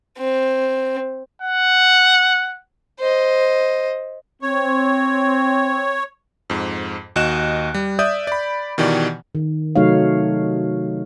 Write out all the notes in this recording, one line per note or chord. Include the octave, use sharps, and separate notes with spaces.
C4
F#5
C5 D#5
C4 C#5
F2 G#2
D#2 F#4 D#5 F#6 E7
G3
D5 E5 D#6 G6
D5 B5
B2 D#3 E3 G4 D5
D#3
C3 F#3 A3 D#4 C#5 F5